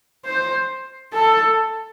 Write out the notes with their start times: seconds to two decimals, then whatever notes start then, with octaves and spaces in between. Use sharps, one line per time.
0.25 C5
1.13 A4